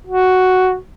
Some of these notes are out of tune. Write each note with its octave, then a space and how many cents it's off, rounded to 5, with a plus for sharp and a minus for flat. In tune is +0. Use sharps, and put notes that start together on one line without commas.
F#4 +0